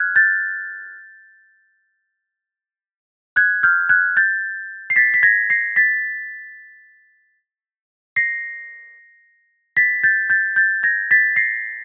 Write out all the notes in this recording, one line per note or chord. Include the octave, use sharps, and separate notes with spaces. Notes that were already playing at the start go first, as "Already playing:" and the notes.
Already playing: F6 F#6 G#6
G6 A6
F#6 G#6
F6 G6
F#6 G#6
G6 A6
C7
A6 B6
B6
G#6 A#6
A#6 C7
A6 B6
A#6 C7
A6 B6
G6 A6
G6 A6
G6 A6
G#6 A#6
A6 B6
A#6 C7